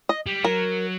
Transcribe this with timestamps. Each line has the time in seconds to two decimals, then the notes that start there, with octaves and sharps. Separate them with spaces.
0.09 D#5
0.27 G3
0.44 F#3 A#4